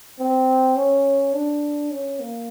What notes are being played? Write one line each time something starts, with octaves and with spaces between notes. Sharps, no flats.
C4
C#4
D4
C#4
A#3